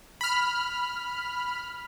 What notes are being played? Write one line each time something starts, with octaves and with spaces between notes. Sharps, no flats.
B5 F6